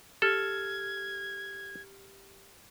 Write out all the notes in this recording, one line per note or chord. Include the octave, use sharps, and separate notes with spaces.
G4 A4 F6 G#6